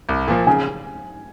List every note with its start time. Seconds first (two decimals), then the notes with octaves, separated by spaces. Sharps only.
0.09 C2
0.28 A#2 F3 A#3
0.47 C#3 G#5